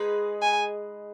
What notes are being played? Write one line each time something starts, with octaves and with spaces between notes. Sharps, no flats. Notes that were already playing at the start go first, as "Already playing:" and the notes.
Already playing: G#3 D#4 G#4 B4
G#5